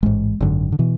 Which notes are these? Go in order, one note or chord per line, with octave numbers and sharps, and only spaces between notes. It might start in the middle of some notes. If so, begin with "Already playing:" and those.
A1 G#2 G#3
G#1 F#2 D3
D3
B2 E3